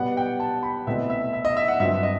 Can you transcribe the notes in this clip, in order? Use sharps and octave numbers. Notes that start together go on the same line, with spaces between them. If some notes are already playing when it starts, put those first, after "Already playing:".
Already playing: B2 G3 B3 F#5
G5
A5
B5
C2 B2 A3 C4 E5
E5
E5
D#5
E5
F#5
G2 F#3 C4 E5
D#5